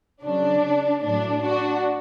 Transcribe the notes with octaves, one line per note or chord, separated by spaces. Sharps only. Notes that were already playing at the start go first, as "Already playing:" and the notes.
C#3 F#3 D4
A2 F#3 D4
D4 F#4